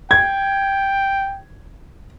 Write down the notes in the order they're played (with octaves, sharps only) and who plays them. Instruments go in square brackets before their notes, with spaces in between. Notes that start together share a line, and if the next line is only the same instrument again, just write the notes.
[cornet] G5 [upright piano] G#6